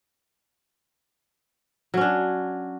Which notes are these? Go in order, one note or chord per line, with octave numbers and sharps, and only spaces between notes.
F#3 C#4 D4